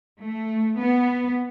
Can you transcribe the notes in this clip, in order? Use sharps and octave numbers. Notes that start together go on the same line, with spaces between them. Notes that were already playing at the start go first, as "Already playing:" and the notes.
A3
B3